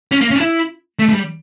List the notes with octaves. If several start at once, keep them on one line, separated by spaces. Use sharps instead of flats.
C#4
A#3
C#4
D4
E4
A3
A3
G3